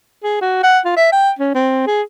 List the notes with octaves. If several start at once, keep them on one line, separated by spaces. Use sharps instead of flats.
G#4
F#4
F#5
F4
E5
G5
C#4
C4
G#4